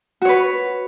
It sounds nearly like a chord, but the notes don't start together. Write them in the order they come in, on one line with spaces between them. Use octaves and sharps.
F#4 C#5 B4